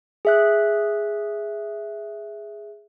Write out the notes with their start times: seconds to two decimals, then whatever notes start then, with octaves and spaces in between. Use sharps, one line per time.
0.25 G#4 E5 F#6